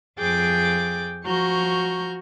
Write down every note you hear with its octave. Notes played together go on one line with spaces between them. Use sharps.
F2 F3 G#4 G5 D6 A6
F3 F#4 A#5 C#6 F6 G6